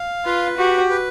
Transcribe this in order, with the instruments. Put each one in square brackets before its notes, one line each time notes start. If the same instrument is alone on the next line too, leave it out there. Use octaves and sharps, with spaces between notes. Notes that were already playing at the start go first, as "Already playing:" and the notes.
Already playing: [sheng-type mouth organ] F5
[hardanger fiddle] F4 [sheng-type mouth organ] B4
[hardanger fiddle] F#4 [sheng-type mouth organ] G4
[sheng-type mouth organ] B4